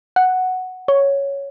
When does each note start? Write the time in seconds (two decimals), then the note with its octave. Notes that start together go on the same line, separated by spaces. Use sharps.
0.16 F#5
0.88 C#5